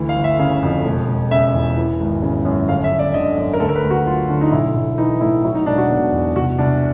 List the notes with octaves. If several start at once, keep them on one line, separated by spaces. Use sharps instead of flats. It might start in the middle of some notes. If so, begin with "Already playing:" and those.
Already playing: D2 E3
F5
G1
E5
C#3 F5
F2
E1
E1
C#3 E5
E2
E3
G#1
C#3
F#2
G1 F5
E5
G1
D5
D3 D#5
F#2
A#4
D2 A4
A#4
B4
D2
F#4
F#3 F4
D3
D#4
B1 E4
B1
E3 D#4
A2 E4
F#3 E4
D#4
E1 D4
F#4
B2
E2
C2 F#4
C2 D4